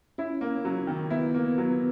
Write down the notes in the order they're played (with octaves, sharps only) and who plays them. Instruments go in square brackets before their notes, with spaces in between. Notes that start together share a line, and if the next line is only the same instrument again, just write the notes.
[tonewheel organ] C#4 [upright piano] E4
[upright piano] A#3
F#3
D#3
[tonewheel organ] B3 [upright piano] E4
[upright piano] A#3
F#3